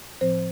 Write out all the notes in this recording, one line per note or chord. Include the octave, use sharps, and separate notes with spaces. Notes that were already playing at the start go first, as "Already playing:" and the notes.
A2 F3 C4 C5